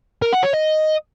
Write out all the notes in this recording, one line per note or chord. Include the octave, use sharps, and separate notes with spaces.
A#4
F#5
C#5
D#5